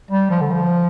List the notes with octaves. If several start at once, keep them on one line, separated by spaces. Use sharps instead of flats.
G3
F3
D3
F3